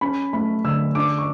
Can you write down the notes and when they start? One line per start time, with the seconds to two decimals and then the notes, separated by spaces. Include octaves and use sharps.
0.01 C#4 B5
0.33 A3 B5
0.64 D3 E6
0.95 D4 D6
1.18 C#6